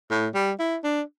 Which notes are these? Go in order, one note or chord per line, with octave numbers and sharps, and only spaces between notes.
A2
G3
E4
D4